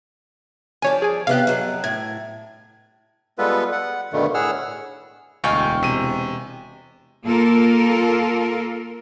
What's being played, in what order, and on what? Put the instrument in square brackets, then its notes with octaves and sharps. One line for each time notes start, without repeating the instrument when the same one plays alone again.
[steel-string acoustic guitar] G2 F3 D5 [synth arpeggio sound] C#5 G#5
[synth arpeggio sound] G#4 G#5
[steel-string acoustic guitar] C3 B3 G4 [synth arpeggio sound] F5 F#6
[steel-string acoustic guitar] F2 F#3
[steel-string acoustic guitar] A2 [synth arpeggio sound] G#6
[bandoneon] G3 G#3 B3 F4 A4 B4
F#5
G2 B2 D3 D#3 G3 A3
A2 G#4 F#5 E6 F6
[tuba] E1 [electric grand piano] D2 [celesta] D#5 G#5 C#6 [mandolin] F5 G5
[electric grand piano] C3 D#7
[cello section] A#3 F4 A4 A#4